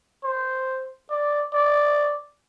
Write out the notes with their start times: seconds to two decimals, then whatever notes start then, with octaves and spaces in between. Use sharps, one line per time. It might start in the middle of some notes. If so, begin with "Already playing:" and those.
0.24 C5
1.10 D5
1.54 D5